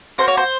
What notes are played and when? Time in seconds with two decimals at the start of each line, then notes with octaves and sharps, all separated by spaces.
0.18 A#3 C#4 F#4 C5
0.28 C#5
0.37 C5